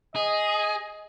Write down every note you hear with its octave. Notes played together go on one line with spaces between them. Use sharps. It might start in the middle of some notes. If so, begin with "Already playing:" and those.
G#4 D#5